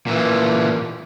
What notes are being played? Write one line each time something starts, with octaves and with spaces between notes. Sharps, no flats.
A#2 E3